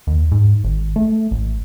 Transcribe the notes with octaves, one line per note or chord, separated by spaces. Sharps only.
D#2
G#2
G#1
A3
A1